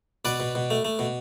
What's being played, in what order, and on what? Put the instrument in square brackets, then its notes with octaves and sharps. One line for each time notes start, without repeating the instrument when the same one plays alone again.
[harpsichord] B2 B4 D5
B2
B2
A3
A3
B2